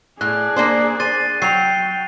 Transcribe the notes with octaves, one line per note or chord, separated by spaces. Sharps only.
A2 G#4 D5 F#6
A#3 D4 C5
C5 A6 D#7
F#3 G5 C7 F7